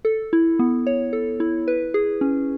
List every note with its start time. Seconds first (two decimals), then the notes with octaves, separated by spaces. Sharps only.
0.05 A4
0.33 E4
0.59 B3
0.87 C#5
1.13 A4
1.40 E4
1.68 B4
1.94 G#4
2.21 C#4